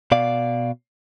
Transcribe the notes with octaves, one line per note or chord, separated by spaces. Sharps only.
B2 D5 F5